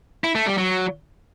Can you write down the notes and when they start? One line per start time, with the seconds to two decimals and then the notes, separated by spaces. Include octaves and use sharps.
0.24 E4
0.35 A3
0.47 G3
0.58 F#3